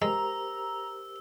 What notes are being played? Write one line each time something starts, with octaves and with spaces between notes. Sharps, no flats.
G#3 G4 A#4 C5 A#5 E6